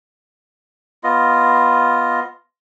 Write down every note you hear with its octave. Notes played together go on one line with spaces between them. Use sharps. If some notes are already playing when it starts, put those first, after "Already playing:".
B3 F4 D#5